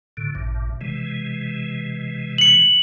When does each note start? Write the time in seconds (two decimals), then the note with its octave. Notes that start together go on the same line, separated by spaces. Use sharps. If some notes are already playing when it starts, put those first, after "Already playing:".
0.17 A2 D3
0.35 A1 G2 A#2
0.81 C3 E3 G#3
2.38 C#7 F#7